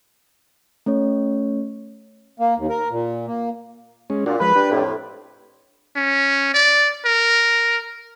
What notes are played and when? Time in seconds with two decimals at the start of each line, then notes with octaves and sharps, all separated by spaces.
0.86 A3 C#4 C#5
2.40 A#3
2.57 D#2
2.69 A#4
2.91 A#2
3.27 A#3
4.10 G#3 C#4
4.26 A#2 D4 F4 F#4
4.40 F3 G#3 B4
4.56 D4 G4
4.71 F2 A2
5.96 C#4
6.54 D5
7.05 A#4